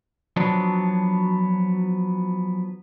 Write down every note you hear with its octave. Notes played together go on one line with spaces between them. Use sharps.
F3 F#3 B3 D4